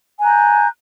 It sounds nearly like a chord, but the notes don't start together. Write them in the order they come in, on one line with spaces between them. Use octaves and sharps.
G#5 F#6 A#5 G6